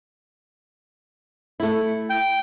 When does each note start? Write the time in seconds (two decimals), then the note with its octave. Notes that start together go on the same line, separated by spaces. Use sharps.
1.60 A3 E4
2.10 G5 G6